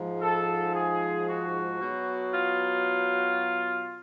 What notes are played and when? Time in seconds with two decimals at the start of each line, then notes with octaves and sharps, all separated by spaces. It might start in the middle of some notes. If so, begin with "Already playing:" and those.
Already playing: G#2 F3
0.21 A4
0.74 G#4
1.27 F#4
1.80 B2 F#3
2.33 F4